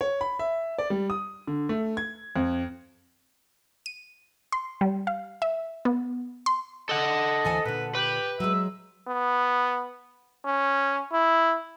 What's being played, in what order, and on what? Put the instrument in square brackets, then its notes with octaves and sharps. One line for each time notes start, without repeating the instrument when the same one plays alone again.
[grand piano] C#5
B5
E5
D5
G3
D#6
D3
A3
G#6
F2
[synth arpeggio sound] D#7
C6
G3
F5
E5
B3
C6
[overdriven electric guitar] A4 F#5 [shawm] D#5
[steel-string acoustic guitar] D2 E3 G#5
[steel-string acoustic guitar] A#2 D3 [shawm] B4
[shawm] G4 [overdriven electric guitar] B4
[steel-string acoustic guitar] F#3 G#3 [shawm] E5
[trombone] B3
C#4
E4